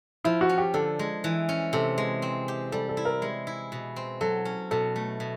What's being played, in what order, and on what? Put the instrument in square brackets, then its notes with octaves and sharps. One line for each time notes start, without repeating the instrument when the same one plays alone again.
[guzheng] F3 [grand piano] E4
[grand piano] F#4
[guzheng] C#4
[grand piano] G4
[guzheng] D3 [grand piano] A4
[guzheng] G#3
E3
C#4
[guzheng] C3 [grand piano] A4
[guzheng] G#3
C4
G4
[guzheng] G3 [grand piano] A4
[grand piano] A4
[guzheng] E4
[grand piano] A#4
[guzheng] G#3
E4
B2
C4
[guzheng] F#3 [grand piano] A4
[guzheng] C#4
[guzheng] B2 [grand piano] A4
[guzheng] A3
B2